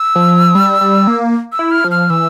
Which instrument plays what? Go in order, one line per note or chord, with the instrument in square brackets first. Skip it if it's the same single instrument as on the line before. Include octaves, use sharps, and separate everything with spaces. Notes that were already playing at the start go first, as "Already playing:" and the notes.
Already playing: [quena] E6
[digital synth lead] F3
G3
G3
A#3
[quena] E6
[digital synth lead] E4
[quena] F6
[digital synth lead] F3
[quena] F6
[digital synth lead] E3 [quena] E6